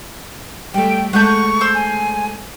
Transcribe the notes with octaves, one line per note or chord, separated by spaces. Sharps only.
G3 A3 G5
G#3 A3 F#5 A5 C#6 G6
C5 E6
G#5